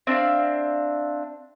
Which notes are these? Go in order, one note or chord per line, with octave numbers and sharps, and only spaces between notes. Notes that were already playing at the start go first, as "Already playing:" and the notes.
C4 D4 E5 F5